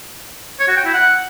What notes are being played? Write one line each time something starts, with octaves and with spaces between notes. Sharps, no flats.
C#5
F#4
G5
E4
F#5